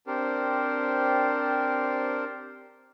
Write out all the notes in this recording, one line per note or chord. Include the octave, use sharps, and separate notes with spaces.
C4 D4 G4 A#4 C5